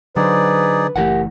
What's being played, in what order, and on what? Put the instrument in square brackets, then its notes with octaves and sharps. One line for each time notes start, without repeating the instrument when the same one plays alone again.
[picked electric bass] D3 [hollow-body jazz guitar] F#3 C5 [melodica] D#4 G#4 D5 [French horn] B4
[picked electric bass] F#1 E3 A3 [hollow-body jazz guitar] G4 A#4 F#5